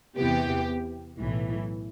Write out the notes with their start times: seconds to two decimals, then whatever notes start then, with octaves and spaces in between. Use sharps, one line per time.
0.16 E2 C3 E3 B3 G4
1.17 B1 A2 E3